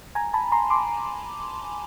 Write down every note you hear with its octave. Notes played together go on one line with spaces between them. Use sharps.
G#5 A#5
A5 B5
A#5 C6
C6 D6